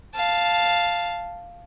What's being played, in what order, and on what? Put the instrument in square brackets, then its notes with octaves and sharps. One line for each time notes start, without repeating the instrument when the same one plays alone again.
[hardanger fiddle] F5 A5